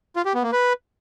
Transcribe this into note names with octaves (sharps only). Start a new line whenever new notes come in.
F4
G4
B3
A#3
B4